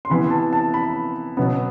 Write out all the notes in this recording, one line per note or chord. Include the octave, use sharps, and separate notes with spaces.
C6
C3 E3 B3 B5
A5
A5
B5
B2 F#3 B3